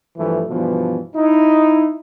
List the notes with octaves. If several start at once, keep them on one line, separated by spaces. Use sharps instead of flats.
G2 E3 F3 A3
G2 B2 E3 F3
D#4 E4